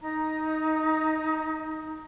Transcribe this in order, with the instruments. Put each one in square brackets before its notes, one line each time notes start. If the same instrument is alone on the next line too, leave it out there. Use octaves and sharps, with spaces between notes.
[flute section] D#4 A#5